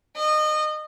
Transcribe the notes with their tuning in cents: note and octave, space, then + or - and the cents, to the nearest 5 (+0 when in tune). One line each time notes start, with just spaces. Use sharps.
D#5 -25